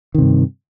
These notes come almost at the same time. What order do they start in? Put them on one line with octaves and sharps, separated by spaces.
D#3 C3 G2